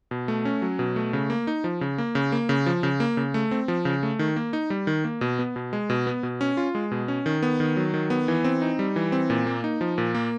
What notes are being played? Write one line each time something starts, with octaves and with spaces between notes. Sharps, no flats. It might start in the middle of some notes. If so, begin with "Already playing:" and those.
B2
A3
C#4
F#3
B2
A3
C#3
A#3
D#4
F3
C#3
A#3
C#3
A#3
C#3
F3
C#3
A#3
C#3
A3
C4
F3
C#3
A3
D#3
A#3
D#4
G3
D#3
A#3
B2
B3
B2
G#3
B2
B3
B2
C#4
F4
G#3
B2
C#4
D#3
B3
D#3
F#3
D#3
B3
E3
C4
D#4
G3
E3
C4
A#2
A#3
D#4
F3
A#2
A#3